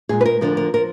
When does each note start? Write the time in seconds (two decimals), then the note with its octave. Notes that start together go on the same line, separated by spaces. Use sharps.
0.09 A#2 G#3 G#4
0.21 B4
0.25 A#4
0.41 D2 D3 F3 A#4
0.57 A#4
0.74 F3 A#4